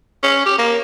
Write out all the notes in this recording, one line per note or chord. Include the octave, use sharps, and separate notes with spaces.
C#4
G4
A#3